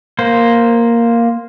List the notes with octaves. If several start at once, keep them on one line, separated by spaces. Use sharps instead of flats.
A#3 C5